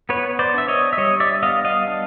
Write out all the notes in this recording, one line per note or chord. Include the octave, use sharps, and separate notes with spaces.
B3 B4 C#5
C5 D5
D4 E5
C#5 D#5
E5
G3 C#5 D#5
D5 E5
B3 D#5 F5
D#5 F5
D4